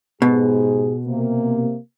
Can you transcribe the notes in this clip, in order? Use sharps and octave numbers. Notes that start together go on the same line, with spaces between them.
G#2 B2 G4 G#4
C3 A#3